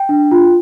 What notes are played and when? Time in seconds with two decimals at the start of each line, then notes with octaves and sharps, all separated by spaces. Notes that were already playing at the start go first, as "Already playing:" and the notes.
Already playing: G5
0.09 D4
0.31 F4